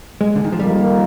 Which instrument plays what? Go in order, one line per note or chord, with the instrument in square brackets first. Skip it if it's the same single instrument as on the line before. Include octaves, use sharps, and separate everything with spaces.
[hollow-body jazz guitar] G#3
D3
D#3
F3
[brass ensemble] F2 D#3 A#3 F4 [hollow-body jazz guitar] G3